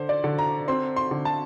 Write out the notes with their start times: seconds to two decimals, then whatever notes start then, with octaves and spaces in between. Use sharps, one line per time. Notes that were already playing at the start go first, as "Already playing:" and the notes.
Already playing: D3 C5
0.09 D5
0.24 D3
0.38 A#5
0.68 C4 C6
0.96 C6
1.11 D3
1.25 A5